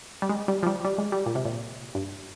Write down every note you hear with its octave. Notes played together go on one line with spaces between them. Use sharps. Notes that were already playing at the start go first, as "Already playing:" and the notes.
G3
G#3
G3
F3
G3
G3
G#3
G3
A#2
C3
A#2
G2